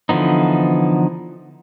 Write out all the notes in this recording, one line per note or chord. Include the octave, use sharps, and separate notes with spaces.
D3 E3 F3 B3 D#4